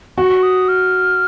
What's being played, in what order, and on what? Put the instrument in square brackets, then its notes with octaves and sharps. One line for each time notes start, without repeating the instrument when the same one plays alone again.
[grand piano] F#4 [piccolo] C#6
[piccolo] D#6
F6